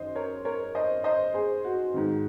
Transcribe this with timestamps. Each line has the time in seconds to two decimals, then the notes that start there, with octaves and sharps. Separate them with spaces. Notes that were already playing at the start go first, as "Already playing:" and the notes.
Already playing: F#2 D#3 C5 D#5
0.15 A#4 C#5
0.45 A#4 C#5
0.75 C5 D#5
1.04 C5 D#5
1.34 G#4 C5
1.64 F#4
1.94 G#2 D#3